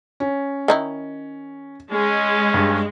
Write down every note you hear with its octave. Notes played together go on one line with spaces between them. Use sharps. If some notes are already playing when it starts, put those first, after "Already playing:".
C#4
D#3 D#4 E4
G#3 C#4
G2